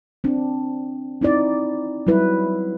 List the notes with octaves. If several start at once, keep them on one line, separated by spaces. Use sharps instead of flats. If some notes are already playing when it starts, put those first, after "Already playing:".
C4 D4
C4 D#4 E4 D5
F#3 G3 E4 B4